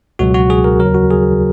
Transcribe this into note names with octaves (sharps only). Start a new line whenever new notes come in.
C#2 B2 F#3 F#4
F#4
G#4
A#4
D#2 C#3 F#3 A#4
F#4
G#4